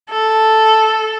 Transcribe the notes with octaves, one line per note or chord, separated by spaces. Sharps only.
A4